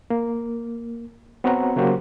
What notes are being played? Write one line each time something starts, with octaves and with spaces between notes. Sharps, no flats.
A#3
B3 C4 F#4 C#5 F#5 A#5
C#3 F#3 A#3 F#4 G4 C5